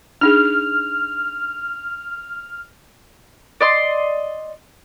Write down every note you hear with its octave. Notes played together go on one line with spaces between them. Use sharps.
D4 D#4 G#4 F6
D5 D#5 C6